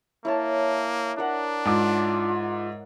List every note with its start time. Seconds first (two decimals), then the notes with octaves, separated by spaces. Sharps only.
0.25 A#3 E4 C#5 A5
1.18 D4 A#4 F#5
1.65 G#2 F4 D6